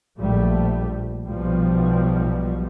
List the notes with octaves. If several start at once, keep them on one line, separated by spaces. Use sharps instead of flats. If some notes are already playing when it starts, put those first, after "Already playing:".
A#1 G3 A3
B1 B2 F3 G3